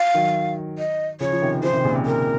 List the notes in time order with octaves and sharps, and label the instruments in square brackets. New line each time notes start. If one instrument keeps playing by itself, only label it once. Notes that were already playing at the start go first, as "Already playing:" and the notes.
Already playing: [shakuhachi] F5
[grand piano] D#3 F#3
[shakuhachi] D#5
[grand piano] C#3 F3 [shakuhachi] C#5
[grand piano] F3
C3 D#3
[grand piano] C#3 F3 [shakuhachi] C5
[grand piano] C3 D#3
A#2 C#3
C3
[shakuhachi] A#4